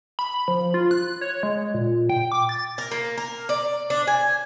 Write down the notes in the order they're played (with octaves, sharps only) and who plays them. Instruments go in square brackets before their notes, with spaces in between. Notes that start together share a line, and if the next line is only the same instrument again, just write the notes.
[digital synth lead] B5
F3
F4
F#6
C#5
G#3
A#2
G5
D6
A6
[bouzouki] A#4
A#3
A#4
D5
D4
G#5